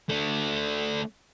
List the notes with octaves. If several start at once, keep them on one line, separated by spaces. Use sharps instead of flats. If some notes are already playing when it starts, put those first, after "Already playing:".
A3 D4